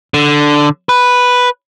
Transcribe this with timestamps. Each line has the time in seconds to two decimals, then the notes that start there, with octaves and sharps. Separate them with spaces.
0.14 D3
0.89 B4